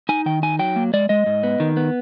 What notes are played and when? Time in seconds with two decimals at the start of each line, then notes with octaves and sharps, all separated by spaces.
0.09 D#4 G#5
0.26 D#3 G5
0.43 D#4 G#5
0.59 F#3 G5
0.76 A#3
0.93 G#3 D5
1.09 G#3 D#5
1.26 G#2
1.43 B3
1.60 D#3
1.77 B3